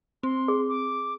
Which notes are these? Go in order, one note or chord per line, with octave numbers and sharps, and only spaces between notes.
C4 C6
G#4
D6